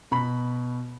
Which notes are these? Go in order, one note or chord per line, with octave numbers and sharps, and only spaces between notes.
B2 B5